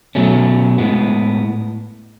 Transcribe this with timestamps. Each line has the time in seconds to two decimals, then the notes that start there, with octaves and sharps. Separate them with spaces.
0.15 B2 F#3 A3 C#4
0.78 A2 G#3 B3